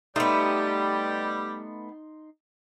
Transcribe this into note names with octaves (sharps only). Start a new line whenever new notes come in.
G3 A3 B3 D#4 G4 C6